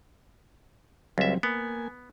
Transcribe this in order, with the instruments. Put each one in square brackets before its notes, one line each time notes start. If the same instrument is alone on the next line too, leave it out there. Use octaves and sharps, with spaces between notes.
[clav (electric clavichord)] C#2 E5 [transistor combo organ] F#3 G3 C4
[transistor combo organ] A#3 G#5 [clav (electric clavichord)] B3